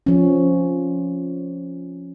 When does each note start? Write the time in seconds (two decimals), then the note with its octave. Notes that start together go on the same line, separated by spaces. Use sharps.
0.06 F3 C#4